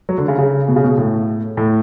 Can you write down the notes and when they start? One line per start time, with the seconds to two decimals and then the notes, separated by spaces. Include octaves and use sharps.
0.09 F#3
0.18 D3
0.28 C#3
0.38 C#3
0.68 B2
0.76 C#3
0.84 B2
0.98 A2
1.57 A2